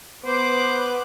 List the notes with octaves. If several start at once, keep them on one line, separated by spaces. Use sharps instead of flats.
B3 B4 C5 D6 F#6